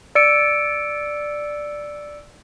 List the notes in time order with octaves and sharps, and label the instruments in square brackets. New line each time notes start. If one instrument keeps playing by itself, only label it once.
[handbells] D5 E6 C#7 D7